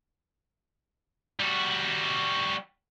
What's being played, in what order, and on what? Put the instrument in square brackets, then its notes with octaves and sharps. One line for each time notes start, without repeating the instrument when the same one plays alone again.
[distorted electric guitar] G3 F#4